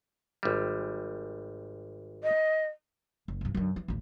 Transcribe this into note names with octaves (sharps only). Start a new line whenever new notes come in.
G#1 G3
D#5
F#1
C2 G2
F#2 D3
E3
A1 D2